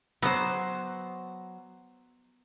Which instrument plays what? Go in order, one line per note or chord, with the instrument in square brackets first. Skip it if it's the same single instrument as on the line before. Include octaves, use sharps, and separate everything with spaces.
[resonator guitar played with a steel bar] F#3 C5 [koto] B3